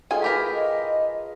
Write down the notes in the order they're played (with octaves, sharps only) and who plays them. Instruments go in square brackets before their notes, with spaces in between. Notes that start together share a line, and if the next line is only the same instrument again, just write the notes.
[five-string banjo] D#3 G#5 [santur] A3 F4 G#4
[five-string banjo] F#4 G4 A#4 [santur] B4 C#5 A#5 [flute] B6
[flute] D#5